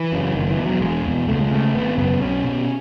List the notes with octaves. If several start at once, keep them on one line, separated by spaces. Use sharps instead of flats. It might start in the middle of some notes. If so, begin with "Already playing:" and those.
Already playing: E3
F#2 C#3
F#1 D#3
E3
E2 B2
F#3
E1 G#3
E2 B2
C#2 A3
G#3
C#3 A3
G#1 B3
F#2 C#3 B3
B1 C#4
B2